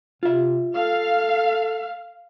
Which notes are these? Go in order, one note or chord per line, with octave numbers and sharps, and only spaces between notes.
C3 F4 E5
A4 F5